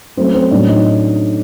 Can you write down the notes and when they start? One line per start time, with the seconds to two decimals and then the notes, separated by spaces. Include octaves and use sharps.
0.17 F#3 A3 C4 C#4 C5
0.34 C4 C5
0.51 A2 F#3 A3 C#4 D4 D5
0.68 D#4 D#5